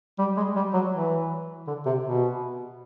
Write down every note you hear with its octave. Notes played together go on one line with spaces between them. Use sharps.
G3
G#3
G3
F#3
E3
D3
C3
B2